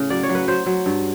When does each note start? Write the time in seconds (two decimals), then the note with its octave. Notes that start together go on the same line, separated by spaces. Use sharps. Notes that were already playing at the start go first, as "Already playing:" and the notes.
Already playing: A2 C#3
0.10 F#3 D5
0.23 C#5
0.29 F#3
0.35 B4
0.48 F#3 C5
0.66 F#3
0.86 G2